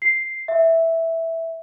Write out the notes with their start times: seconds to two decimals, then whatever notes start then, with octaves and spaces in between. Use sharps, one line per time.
0.02 C7
0.48 E5